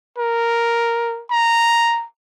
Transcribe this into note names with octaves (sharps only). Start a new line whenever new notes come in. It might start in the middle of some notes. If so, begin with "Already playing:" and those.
A#4
A#5